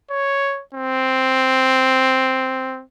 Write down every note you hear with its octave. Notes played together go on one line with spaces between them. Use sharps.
C#5
C4